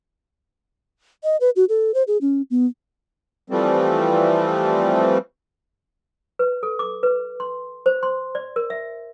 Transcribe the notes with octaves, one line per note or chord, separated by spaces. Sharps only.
D#5
B4
F#4
A4
C5
G#4
C#4
B3
E3 F3 G3 A3 C4
B4
A4
D6
B4
C6
C5
C6
D5
A#4
E5